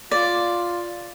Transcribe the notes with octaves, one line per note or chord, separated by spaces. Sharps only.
F4 D5